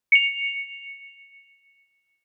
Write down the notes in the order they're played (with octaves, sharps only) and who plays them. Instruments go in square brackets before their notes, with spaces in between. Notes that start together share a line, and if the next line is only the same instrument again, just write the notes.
[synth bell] C#7 F7